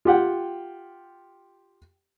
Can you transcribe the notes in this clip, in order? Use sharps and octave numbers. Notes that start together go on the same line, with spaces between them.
F4 G4 F#5 G5